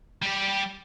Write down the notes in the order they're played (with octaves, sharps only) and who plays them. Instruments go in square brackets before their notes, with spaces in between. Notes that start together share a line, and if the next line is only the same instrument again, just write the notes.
[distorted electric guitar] G3 G4